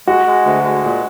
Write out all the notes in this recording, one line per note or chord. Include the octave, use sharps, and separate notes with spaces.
G#3 F#4
G#3
D2
G#3
A#2